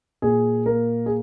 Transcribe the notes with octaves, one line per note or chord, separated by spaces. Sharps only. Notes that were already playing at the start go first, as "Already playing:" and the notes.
A#2 G#4
A#3 A#4
G#4